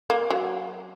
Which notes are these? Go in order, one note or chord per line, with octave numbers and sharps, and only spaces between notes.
A#3
F#3